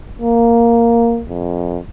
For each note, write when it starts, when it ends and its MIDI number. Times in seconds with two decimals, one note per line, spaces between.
0.22 1.23 58
1.29 1.78 41